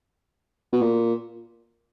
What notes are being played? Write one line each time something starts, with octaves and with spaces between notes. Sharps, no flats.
B2
A#2